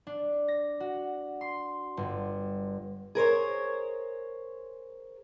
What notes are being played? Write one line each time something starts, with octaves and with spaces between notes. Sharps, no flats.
D4
A#6
F#4
C6
G1
G#4 A#4 C5 C#5